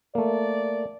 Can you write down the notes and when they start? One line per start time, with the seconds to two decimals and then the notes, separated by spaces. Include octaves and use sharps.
0.15 A3 A#3 D5